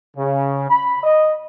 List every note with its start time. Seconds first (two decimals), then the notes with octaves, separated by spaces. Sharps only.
0.17 C#3
0.70 B5
1.04 D#5